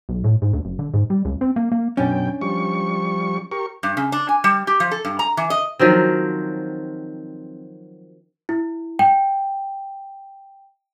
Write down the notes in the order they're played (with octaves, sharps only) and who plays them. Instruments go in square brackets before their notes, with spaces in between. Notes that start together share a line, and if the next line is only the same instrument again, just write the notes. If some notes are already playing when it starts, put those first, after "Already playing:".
[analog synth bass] B1
A2
G#2
D2
F#1
D3
G#2
G3
C#2
C4
A#3
A#3
[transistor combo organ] F#2 B2 G5 [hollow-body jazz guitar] C#4 D4
[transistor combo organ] F3 G3 C#6
G4 A#4 C#6
[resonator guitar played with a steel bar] G2
C#3
D4
G#5
G3
G4
F3
A4
G2
A#5
E3
D#5
[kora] D#3 F3 F#3 C4
[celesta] E4
G5